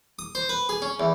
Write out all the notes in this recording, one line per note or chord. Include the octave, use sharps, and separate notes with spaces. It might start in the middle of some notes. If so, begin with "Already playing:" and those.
D#6
C5
B4
G#4
C#4
E2